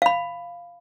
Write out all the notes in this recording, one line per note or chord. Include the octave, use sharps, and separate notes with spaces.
F5 B5